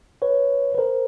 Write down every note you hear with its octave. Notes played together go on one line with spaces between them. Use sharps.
B4 C#5
B4
A#4 C5